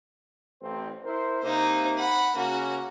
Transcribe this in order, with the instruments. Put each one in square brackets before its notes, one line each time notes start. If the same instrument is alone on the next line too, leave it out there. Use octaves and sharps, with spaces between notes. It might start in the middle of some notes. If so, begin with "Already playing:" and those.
[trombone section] A1 C4
E4 A#4 C5
[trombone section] C3 A#3 [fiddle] D#4 C5
[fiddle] F#5 B5
[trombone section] C#3 C#4 [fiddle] A#3 F#4